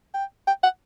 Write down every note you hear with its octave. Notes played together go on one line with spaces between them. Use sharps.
G5
G5
F#5